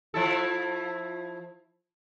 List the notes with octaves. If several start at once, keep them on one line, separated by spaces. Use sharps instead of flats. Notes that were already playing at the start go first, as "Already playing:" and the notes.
F3 E4 A4